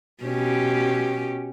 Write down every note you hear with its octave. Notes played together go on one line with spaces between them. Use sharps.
B2 C#4 G4